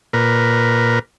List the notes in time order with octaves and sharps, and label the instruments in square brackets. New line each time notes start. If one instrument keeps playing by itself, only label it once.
[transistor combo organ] A#2 A#4 B4